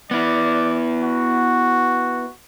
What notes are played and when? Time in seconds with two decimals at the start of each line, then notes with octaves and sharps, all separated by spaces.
0.11 B3 E4 D5
1.02 F#4